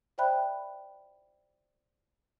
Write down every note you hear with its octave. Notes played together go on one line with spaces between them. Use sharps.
C5 D5 E5 G5 B5 F#6